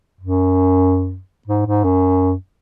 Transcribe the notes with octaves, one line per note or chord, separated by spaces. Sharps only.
F#2
G#2
G#2
F#2